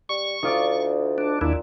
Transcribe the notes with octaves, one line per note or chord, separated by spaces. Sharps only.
G3 C#6
D2 D#4 F4 D5
D4
D#2 A#2 D4 E4